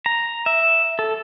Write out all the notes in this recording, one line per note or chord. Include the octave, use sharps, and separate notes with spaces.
A#5
E5
A4